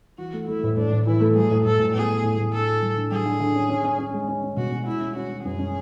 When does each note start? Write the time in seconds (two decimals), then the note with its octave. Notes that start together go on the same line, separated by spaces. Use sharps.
0.18 E3 F#4
0.33 A3
0.48 A3 E4
0.63 A2
0.77 A2 D4
0.92 A2
1.06 E3 E4
1.21 A3
1.36 F#3 G#4
1.51 A2
1.65 A2 A4
1.79 A2
1.94 B3 G#4
2.09 B3
2.23 A2
2.38 A2
2.52 D3 A4
2.67 F#4
2.82 F#3
2.96 D3
3.11 F#3 G#4
3.26 D3
3.40 D3
3.55 C#4
3.69 C#4
3.84 C#4
3.98 C#4
4.13 G#3
4.28 C#4
4.43 C#4
4.57 B2 F#4
4.71 C#4
4.86 G#3 E4
5.01 C#4
5.16 C#4 F#4
5.30 C#4
5.45 F#2 G#4
5.59 C#4